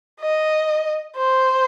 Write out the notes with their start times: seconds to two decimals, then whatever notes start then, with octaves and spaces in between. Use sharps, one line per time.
0.21 D#5
1.17 C5